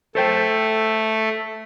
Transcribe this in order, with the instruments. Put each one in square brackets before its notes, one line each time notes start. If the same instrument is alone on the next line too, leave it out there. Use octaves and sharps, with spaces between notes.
[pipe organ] A3 [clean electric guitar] A4 C5 G5